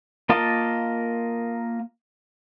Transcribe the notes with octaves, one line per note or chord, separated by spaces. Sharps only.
A#3 F4 A#4 D#5 A5